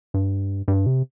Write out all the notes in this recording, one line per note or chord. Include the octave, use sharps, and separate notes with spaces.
G2
G2
C3